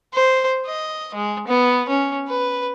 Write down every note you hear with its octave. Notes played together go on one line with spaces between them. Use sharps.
C5
D#5
G#3
B3
C#4
B4